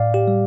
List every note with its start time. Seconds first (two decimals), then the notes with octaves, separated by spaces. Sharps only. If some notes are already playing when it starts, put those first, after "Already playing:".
Already playing: A2 D5 F5
0.14 G4
0.28 G3